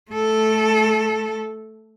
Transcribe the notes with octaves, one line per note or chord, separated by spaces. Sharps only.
A3 A4